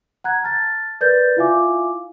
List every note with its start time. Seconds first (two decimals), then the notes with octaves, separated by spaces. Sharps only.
0.24 F#5 A#5 F#6 G#6
0.43 A5 F6 A6
1.01 A#4 B4 D5 G6 A6
1.37 E4 F4 E5 F5 G#5 D6